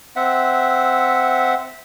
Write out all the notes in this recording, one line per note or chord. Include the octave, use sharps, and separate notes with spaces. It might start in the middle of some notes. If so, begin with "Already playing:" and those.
C4 E5 F#5